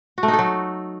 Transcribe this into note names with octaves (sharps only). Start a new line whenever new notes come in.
F#4
A3
D#4
A4
F#3